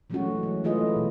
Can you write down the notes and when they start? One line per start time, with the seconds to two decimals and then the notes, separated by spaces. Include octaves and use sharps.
0.10 E3 F#3 G#3 A3 C#4 F#4
0.43 F#3
0.64 E3 A3 F4 G#4 B4 D#5
0.96 B2